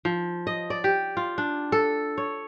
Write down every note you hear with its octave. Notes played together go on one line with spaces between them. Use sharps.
F3
D#5
D5
G4
F4
D4
A4
C#5